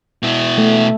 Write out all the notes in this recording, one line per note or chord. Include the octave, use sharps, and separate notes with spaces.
B2 E4
A3